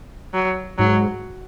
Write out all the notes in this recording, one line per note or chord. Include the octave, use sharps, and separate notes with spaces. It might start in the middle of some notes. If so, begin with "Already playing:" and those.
F#3
G#2 F#3